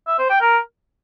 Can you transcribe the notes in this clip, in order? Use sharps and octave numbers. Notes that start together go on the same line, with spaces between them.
E5
C5
G5
A#4